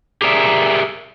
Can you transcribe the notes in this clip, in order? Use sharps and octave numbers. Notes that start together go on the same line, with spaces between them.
G4 G#4 A#4 D5 E5